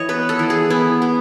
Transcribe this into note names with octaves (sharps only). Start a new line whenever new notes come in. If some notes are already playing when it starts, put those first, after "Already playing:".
Already playing: E3 C#5 D#5
B3 B4
A4
E3
G#4
B3 E4
B3